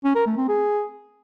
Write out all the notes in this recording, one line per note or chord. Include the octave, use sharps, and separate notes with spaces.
C#4
A#4
A3
C4
G#4